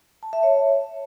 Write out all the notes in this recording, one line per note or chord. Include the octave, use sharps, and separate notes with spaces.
A5
E5
C#5